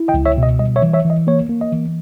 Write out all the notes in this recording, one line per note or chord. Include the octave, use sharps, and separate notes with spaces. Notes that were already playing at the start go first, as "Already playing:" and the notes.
Already playing: E4
D#5 G5
C#2
C#5 E5
B2
D#5
G3 D#5
C#5 E5
E3
C#5 E5
E3
D#5
A#3 C#5
A#3
D#5
E3